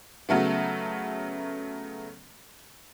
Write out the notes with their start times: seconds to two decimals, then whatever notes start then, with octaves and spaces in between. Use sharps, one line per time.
0.29 C#3 F#3 A3 B3